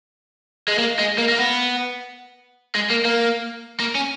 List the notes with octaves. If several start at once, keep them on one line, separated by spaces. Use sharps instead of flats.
G#3
A#3
G#3
A#3
A#3
B3
G#3
A#3
A#3
A#3
C#4